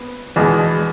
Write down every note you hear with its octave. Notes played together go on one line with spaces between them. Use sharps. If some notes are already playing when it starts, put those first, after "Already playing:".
Already playing: B3
E2 B2 G#3